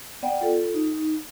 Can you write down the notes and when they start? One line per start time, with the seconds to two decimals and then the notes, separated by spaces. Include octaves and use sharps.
0.23 B3 D5 F#5 G5
0.41 F4 A4
0.74 D#4